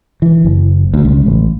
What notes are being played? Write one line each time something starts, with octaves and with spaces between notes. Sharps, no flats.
E3
F#1
D2
C#2
A1